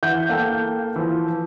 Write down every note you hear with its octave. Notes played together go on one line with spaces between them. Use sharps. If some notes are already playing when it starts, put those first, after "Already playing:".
E3 E5 F#5 G6
A#3 A4 G5 G6
E3 F3